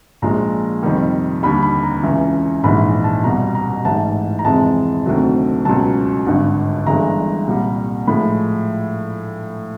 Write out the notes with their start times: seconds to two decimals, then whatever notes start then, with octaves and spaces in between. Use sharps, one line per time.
0.22 A#1 A#2 F3 G#3 A#5
0.83 F2 C3 D#3 G3
1.43 D#2 D3 G3 B5
1.63 B5
1.83 A#5
2.03 C#2 C#3 E3
2.63 A#1 G#2 E3 G#3 B5
3.04 A5
3.24 C2 B2 G3 A#5
3.55 A#5
3.85 A1 G#2 E3 A5
4.39 A#5
4.45 F2 C3 E3 G#3 A5
5.06 D2 C3 D#3 F#3
5.65 C#2 B2 F#3 A5
6.26 G#1 G2 D3
6.86 G1 G2 E3 G#3 A#5
7.47 C2 A#2 G3
8.07 A2 F3 G#3 B5